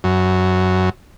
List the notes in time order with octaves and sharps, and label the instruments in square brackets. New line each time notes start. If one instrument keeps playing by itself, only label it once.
[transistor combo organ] F#2